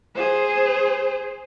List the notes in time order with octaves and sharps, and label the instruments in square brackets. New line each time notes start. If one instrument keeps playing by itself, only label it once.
[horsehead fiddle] G#4 C5